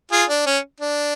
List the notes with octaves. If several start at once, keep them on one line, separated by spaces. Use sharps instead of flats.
F4 G#4
D4
C#4
D4